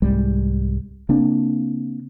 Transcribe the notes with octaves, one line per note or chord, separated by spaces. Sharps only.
C2 G#2 G3 G#3
C#3 A#3 C4 D4